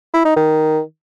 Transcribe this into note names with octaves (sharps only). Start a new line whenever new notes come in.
E4
D#4
D#3